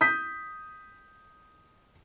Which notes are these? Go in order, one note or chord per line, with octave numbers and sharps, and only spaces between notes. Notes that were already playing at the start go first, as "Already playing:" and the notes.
D#6 G6 B6